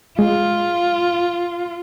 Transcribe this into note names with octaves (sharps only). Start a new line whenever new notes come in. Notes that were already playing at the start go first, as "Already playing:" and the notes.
G#3 F4